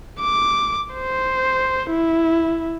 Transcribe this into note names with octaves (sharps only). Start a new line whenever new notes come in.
D6
C5
E4